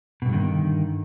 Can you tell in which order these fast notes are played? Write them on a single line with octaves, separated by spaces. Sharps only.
B2 G2 D3 D#3